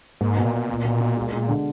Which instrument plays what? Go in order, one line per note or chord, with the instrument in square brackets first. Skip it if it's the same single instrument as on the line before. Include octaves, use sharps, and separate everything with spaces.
[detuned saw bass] G#2 [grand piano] A#3
[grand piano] B2
[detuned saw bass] A#2
[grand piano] A#3
B2
B2
B2
G#3
G#3
D3